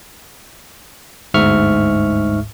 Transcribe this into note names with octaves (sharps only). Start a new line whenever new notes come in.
G1 D2 G#2 E5 C#6 F6